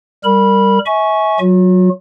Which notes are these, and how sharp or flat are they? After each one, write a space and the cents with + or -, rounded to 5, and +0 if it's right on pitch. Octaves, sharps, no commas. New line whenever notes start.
G3 +0 A#4 -20 B5 -15
E5 -35 G#5 +15 C#6 +0
F#3 +0 F#4 -45